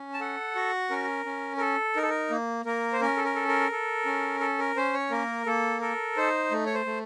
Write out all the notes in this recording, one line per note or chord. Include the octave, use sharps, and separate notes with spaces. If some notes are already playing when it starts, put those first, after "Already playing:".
Already playing: C#4
A5
A4 F#5
F#4
C#4 A#4
C#4
A#4
A4
D#4 A#4
A4
A#4
A#3
A#3 A#4
C5
C#4 A#4
A4
A#4
A4
A#4
A4
C#4
A4
A#4
C#4 C5
C#5
A#3 A#4
A#3 A4
A4 A#4
D#4 C5
A3
C#5
C5
A3